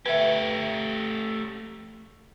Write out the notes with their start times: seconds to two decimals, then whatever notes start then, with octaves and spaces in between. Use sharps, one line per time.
0.06 A3 G4 B4 E5